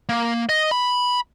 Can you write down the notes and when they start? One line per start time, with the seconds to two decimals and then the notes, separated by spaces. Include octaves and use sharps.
0.09 A#3
0.49 D#5
0.71 B5